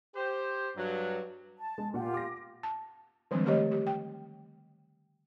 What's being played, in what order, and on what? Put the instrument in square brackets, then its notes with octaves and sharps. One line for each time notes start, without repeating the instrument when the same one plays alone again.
[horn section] G4 C5
G2 F#3
[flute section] A5
[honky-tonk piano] G#3
[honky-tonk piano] A#2 F#5 [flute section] F4 G4
[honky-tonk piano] D6 A#6
[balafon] A5
D#3 F3 G3 G#3 C4 D4
D3 E3 A3 G4 C#5 D#5
G4
G5